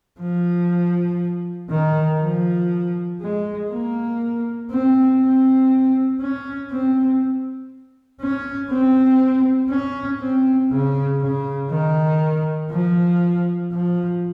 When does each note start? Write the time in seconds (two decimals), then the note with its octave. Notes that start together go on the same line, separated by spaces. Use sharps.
0.20 F3
1.70 D#3
2.20 F3
3.21 G#3
3.70 A#3
4.70 C4
5.20 C4
6.20 C#4
6.71 C4
8.21 C#4
8.71 C4
9.70 C#4
10.21 C4
10.71 C#3
11.21 C#3
11.71 D#3
12.71 F3
13.71 F3